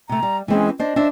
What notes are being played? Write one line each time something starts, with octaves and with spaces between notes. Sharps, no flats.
C3 A3 A#5
G3
E3 G#3 C4 C#4
D4 C5 D#5
D4 C5 E5